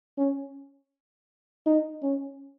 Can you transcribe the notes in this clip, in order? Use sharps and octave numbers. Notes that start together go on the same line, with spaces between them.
C#4
D#4
C#4